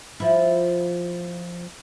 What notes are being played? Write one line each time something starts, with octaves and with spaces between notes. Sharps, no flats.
F3 E4